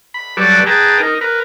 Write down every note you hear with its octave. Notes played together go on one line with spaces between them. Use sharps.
B5
F#3 G3 A4 B4 D5
G#4 B4 G5 A5 A#5
D#4 A#4
A#4 B4